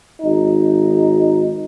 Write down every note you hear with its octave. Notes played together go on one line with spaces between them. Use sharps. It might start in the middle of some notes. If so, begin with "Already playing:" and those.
G#1 D#4